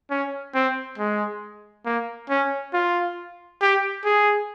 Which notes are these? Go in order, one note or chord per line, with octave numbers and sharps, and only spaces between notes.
C#4
C4
G#3
A#3
C#4
F4
G4
G#4